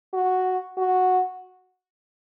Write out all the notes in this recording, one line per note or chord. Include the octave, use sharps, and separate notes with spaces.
F#4
F#4